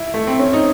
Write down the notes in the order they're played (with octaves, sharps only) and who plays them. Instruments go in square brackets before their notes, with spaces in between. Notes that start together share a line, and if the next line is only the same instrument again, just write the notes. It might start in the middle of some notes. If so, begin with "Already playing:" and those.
Already playing: [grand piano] E4
A3
C4
C#4
D#4